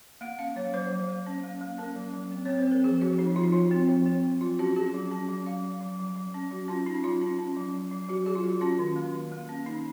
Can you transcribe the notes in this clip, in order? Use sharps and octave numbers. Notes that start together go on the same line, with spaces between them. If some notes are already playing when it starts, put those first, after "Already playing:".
A#3 F#5
C#4 F5
F#3 C#5
F#3 C5
F#3
A#3
C#4
A#3
A#3
C#4 A#4
F#3
F#3
C4
C4 C#5
C5
C4 A#4
F3 G#4
F3 F#4
F3 D#4
F3 F4
D#4
F3 F4
C4
F3
C4
F3
F#3 F4
C#4 F#4
C#4 G#4
F#3
C#4
F#3
F#3 F5
F#3
F#3
F#3
F#3
C#4
F#3 F#4
C#4 F4
C#4 D#4
F#3 F4
C#4
C#4
F#3
F#3
F#3
F#3 F#4
F#3 G#4
F4
F#3 F#4
C#4 F4
D#3
A#3
D#3
A#3
C#4
D#3 D#4